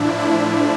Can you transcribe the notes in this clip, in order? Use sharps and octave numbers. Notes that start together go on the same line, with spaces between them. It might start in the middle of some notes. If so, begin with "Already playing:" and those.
Already playing: A2 F3 D4 E4
E4